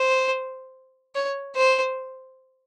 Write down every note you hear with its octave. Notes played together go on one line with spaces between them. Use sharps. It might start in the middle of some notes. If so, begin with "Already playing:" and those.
Already playing: C5
C#5
C5